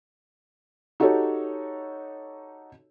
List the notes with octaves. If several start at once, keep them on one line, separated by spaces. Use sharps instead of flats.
D#4 F#4 G4 A4 C#5